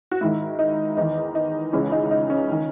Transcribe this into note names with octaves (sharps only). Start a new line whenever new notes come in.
F#4
G#2 D#3 E4
D#4
E2 D#3 D#4
D#4
C#2 C#3 E3 C#4
D#4
D#4
C#4
D#3